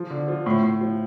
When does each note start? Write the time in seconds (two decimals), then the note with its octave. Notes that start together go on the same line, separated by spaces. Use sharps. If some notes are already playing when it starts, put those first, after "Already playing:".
Already playing: F3
0.10 D3
0.28 F3
0.46 A2
0.63 A2
0.81 F3